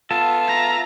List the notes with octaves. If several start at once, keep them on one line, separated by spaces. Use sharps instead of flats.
B3 F4 A4 A5
E5 A#5